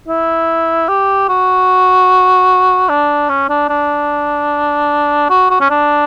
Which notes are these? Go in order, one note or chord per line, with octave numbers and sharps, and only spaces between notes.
E4
G4
F#4
D4
C#4
D4
D4
F#4
F#4
C#4
D4